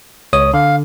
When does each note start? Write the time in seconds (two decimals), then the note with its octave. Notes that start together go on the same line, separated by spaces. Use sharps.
0.33 C#2 C#5 D#6
0.54 D3 F5